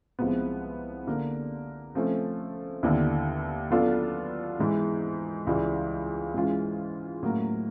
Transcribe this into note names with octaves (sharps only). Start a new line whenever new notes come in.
C2 C3 F3 G#3 B3
D3 G3 A#3
C3 F3 A3 C#4
D#2 D3 G3 B3 E4
F#3 B3 D4 F4 A4
G#2 E3 G#3
C#2 C#3 E3 G3
G#2 E3 G#3 C#4 F4
A2 F#3 A#3